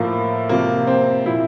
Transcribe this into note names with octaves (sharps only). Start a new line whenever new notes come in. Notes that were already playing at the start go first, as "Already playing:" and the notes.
Already playing: A2 F3 A#3
C3 F3 A#3
C4
A#2 F3 E4